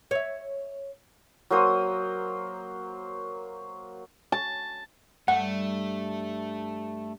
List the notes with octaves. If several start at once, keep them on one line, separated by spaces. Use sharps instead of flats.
C#5 E5
F#3 A#3 C5 D#6
A5
G2 A3 F#5